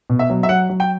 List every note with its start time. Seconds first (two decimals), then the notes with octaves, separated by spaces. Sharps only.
0.10 B2
0.19 E5
0.30 F#3
0.43 E5
0.49 F#3 F#5
0.69 F#3
0.80 G5